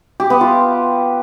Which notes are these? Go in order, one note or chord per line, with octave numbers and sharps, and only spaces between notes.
G4
B3
F4